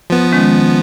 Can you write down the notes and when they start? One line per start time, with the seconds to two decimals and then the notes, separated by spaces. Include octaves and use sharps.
0.10 F3 B3
0.32 D#3 G#3 C#4